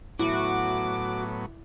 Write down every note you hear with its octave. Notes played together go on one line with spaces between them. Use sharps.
A2 F#3 B3 E4 F#4 D6